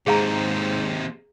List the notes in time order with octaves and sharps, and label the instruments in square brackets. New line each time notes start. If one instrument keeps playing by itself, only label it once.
[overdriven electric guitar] D#2 C3 [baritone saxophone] G#2 [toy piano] G#4 F5 A#5